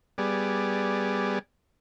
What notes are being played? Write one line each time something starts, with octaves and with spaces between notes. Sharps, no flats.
G3 B3 G#4 D5